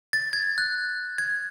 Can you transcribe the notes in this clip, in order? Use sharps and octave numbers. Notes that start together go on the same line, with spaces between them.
A6
G#6
F#6
G#6